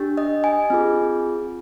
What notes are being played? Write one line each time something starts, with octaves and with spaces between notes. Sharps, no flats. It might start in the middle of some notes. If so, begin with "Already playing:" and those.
Already playing: D4 G4
D#5
G#5
C4 F4 G#4